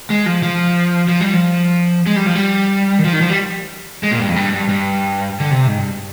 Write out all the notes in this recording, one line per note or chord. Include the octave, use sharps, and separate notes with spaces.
G#3
F3
F3
F3
G3
F3
G#3
G3
F3
G3
D#3
F3
D#3
F3
G3
G#3
A#2
G2
F2
G2
G2
G2
D3
C3
G#2
G2